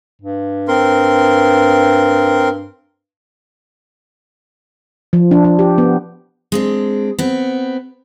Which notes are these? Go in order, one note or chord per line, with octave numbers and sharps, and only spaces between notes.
G2
C4 A#4 C6
F3
D4
D4
G4
B3
G#3 C4 D4
B3 C4